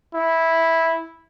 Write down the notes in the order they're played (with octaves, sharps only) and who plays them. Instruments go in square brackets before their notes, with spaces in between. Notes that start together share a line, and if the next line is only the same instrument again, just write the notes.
[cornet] E4